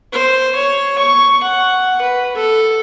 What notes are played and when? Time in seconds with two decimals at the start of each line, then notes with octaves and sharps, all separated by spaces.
0.13 C5
0.55 C#5
0.99 C#6
1.43 F#5
2.02 B4
2.36 A4